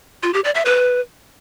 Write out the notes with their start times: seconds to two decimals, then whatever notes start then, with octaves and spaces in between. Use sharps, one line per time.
0.23 F4
0.34 G4
0.44 D5
0.55 E5
0.65 B4